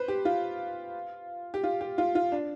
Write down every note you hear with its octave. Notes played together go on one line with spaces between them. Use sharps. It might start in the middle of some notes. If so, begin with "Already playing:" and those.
Already playing: B4 C5
G4
F4
G4
F4
G4
F4
F4
D4